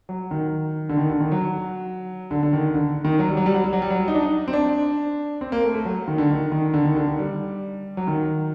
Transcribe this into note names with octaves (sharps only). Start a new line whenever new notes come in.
F#3
D#3
D3
D#3
D3
D#3
F#3
D3
D3
D#3
D3
D#3
F#3
G3
F#3
G3
F#3
G3
F#3
G3
F#3
D#4
D4
D#4
C4
D4
C4
A#3
A3
A3
F#3
D#3
D3
D#3
D#3
D3
D#3
D3
D#3
G3
F#3
D#3